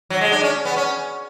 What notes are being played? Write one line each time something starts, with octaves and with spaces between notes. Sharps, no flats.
F#3
G#3
D4
C#4
B3
C#4